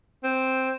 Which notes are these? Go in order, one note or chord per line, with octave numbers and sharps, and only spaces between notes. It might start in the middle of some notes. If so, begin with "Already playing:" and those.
C4